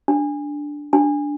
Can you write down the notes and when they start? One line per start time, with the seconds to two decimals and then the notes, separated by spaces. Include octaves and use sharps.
0.08 D4
0.93 D4